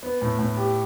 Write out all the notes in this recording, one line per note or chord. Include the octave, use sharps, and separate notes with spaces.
B3
A2
A2
G4